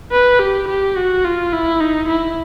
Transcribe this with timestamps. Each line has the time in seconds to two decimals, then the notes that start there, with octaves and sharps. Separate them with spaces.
0.12 B4
0.40 G4
0.68 G4
0.97 F#4
1.25 F4
1.53 E4
1.80 D#4
2.09 E4